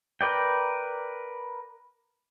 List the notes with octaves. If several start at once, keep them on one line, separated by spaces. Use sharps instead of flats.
A#4 B4 D5 G5